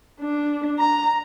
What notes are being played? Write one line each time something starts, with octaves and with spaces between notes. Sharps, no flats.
D4
A#5